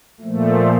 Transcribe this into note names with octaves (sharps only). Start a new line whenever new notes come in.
A#2 F3 A3